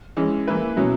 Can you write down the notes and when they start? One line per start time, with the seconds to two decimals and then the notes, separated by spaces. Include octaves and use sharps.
0.17 E3 G#3 C#4
0.48 E3 A#3 E4 B4
0.76 B2 F#3 C#4 E4